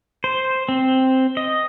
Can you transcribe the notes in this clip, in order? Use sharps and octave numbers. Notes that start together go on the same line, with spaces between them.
C5
C4
D#5